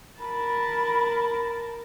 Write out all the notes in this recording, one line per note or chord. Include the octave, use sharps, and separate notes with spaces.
A#4 A5 B5